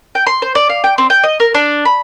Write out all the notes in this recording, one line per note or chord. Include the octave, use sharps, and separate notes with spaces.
G5
C6
C5
D5
F5
G5
C4
G5
D#5
A#4
D4
B5